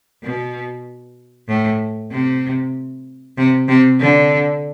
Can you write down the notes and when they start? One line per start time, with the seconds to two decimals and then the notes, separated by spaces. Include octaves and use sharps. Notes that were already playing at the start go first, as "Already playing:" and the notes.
0.23 B2
1.48 A2
2.11 C3
3.37 C3
3.68 C3
4.00 D3